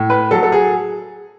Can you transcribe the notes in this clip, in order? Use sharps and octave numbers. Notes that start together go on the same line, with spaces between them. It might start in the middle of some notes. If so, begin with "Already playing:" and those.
Already playing: A2
B4
F#3 A4
A4
G#4